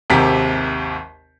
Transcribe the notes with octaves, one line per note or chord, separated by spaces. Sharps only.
G#1 D#2 C3 G4 A#5 B6